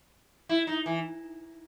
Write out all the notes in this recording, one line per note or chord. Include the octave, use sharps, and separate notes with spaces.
E4
D#4
E3